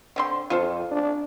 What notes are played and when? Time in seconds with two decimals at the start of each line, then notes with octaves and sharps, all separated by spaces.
0.16 D3 C4 C6
0.50 F2 F4 A4 C5
0.91 D4